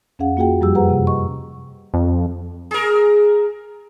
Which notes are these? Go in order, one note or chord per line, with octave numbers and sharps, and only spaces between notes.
F2 C#4 G#4 F5 F#5
A#3 F4 F#4 G#4 G5
F#2 F3 G3 G4 E6
G#4 B4 C5 F#5 A#5
C3
D#5 C#6
F2
G#4 A#4